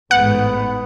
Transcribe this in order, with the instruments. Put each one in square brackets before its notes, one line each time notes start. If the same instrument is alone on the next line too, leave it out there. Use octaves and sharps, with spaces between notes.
[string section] A1 G#2 [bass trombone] B3 [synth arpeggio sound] F#5